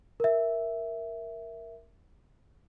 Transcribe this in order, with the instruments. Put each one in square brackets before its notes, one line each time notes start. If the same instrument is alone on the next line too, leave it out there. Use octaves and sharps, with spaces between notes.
[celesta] A#4 E5